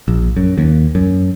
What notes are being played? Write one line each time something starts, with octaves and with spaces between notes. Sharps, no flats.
A#1
F#2
D#2
F#2